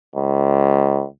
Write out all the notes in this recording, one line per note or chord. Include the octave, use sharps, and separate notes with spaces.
C#2